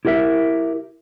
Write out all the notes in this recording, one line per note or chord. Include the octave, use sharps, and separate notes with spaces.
E4 G4 A#4 D#5 E5